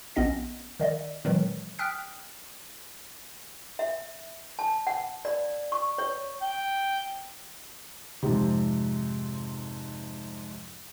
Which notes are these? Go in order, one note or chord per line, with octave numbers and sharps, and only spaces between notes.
A#1 B3 C#4 D#5 A#6
D#3 D5 D#5
A#2 D#3 E3 F#3 G#3
G5 D#6 F6 F#6 B6
E5
A5
F#5
D5
C#6
C#5
G5
F2 G#2 C3